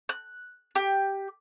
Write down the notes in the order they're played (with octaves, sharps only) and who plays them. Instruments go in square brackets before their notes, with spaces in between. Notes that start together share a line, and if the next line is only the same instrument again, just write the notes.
[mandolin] F#6
G4